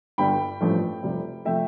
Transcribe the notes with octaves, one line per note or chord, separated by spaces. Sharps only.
G1 G2 D3 G3 G5 B5
A1 G2 F3 A3
F1 F2 C3 G3
C3 F3 A3 E5 G5